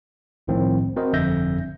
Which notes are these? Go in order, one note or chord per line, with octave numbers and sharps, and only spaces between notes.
G1 C2 A2 D#3 F3 C4
C4 F#4 A#4 C5 D#5
G1 F2 D3 E5 G6 A#6